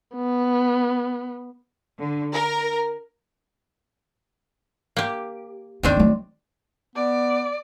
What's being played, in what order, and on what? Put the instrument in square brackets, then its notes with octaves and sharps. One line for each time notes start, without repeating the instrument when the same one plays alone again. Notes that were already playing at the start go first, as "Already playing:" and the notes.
[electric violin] B3
[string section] D3
A#4
[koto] A#3 G4
[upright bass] E2 F4 [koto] D#3 C4 D4
[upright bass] F#3 A3
[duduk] B3 [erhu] D5